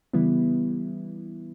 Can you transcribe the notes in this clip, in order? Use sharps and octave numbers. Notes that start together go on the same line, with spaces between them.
C#3 E3 G3 B3 E4